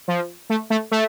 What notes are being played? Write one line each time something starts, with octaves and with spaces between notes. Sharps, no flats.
F3
A3
A3
A3